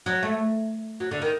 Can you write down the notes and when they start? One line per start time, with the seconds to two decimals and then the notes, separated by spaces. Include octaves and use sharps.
0.06 F#3
0.23 A3
1.00 F#3
1.11 D3
1.22 D#3